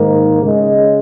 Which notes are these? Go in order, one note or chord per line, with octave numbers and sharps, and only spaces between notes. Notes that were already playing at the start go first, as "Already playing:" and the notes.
Already playing: G#2 D#3 A#3
C#3 G#3